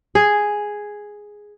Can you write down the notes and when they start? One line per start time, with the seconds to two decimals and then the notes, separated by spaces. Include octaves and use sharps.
0.15 G#4